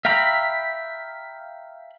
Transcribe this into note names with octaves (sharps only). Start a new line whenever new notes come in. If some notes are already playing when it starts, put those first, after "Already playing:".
E5 F5 G5 A#5 B5